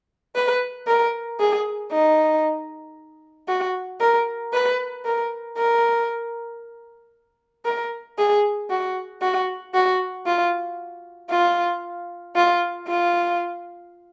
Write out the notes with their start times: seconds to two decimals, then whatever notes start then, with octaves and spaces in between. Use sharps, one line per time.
0.35 B4
0.87 A#4
1.40 G#4
1.91 D#4
3.48 F#4
4.01 A#4
4.53 B4
5.05 A#4
5.57 A#4
7.65 A#4
8.18 G#4
8.70 F#4
9.22 F#4
9.74 F#4
10.26 F4
11.30 F4
12.35 F4
12.88 F4